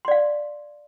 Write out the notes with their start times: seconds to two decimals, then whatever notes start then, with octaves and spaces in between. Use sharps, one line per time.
0.05 C6
0.08 D5
0.11 F5